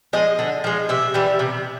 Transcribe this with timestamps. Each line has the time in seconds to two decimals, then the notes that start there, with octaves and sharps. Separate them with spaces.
0.13 F3 G#3 D#5
0.39 D3
0.64 F3 G#3
0.89 C3 E5
1.14 E3 G3
1.39 C3